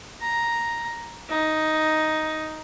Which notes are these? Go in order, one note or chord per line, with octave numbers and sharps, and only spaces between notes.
A#5
D#4